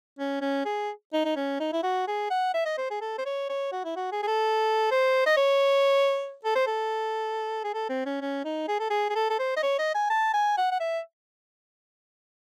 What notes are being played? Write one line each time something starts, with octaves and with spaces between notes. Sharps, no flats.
C#4
C#4
G#4
D#4
D#4
C#4
D#4
E4
F#4
G#4
F#5
E5
D#5
C5
G#4
A4
C5
C#5
C#5
F#4
E4
F#4
G#4
G#4
A4
C5
D#5
C#5
A4
C5
A4
G#4
A4
C4
C#4
C#4
D#4
G#4
A4
G#4
G#4
A4
A4
C5
D#5
C#5
D#5
G#5
A5
G#5
F#5
F#5
E5